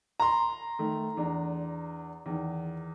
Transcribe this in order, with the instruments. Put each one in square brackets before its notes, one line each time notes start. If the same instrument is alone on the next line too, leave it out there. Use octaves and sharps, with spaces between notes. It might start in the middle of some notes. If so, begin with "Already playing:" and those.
[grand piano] A#5 C6
[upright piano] D#3 A3
E2 D4
E2 D#3